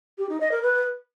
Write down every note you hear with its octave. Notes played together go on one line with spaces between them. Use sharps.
G4
D#4
D#5
A#4
B4